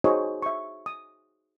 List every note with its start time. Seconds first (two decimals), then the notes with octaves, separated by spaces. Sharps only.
0.04 D#4 F#4 G#4 C5 C#5 D#5
0.42 E5 C#6
0.86 D#6